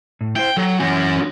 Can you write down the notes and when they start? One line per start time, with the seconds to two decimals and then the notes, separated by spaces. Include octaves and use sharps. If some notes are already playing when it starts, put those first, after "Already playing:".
0.21 A2
0.36 E4 C5 G5
0.57 F#3 A4
0.80 F#2 E3 C#4 F#4 G#5